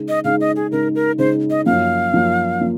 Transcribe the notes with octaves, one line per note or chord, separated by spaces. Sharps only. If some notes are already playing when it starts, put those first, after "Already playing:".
Already playing: C#3 G#3 D#4
D#5
C#3 G#3 D#4 F5
D#5
G#4
C#3 G#3 D#4 A#4
A#4
C#3 G#3 D#4 C5
D#5
F#2 F3 A#3 F5
F#2 F3 A#3
F3 A#3